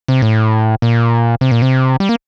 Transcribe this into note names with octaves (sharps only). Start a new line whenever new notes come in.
C3
A2
A#2
C3
A#2
C3
G3
A#3